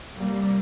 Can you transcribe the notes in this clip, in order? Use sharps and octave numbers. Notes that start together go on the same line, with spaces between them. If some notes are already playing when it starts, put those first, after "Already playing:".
F2 C3 G3 A#3